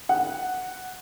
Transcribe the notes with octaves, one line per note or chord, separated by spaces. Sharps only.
F#5